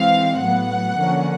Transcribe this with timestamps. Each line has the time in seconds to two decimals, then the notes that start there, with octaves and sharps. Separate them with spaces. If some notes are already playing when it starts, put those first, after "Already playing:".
Already playing: E3 G#3 C4 F5
0.40 A2 F#3 B3 F#5
0.97 D3 F3 A#3 C#4